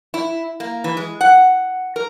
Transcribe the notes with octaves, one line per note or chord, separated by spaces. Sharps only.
E4
A#3
E3
G#3
F#5
A#4